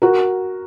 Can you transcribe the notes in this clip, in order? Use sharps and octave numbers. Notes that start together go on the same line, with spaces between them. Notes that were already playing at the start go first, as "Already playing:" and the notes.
F#4 A#4